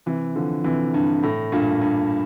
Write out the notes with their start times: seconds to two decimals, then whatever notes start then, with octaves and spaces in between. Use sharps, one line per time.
0.06 C3 E3
0.36 D3 F3
0.64 C3 E3
0.94 G2
1.23 A2
1.52 G2 A#2
1.81 G2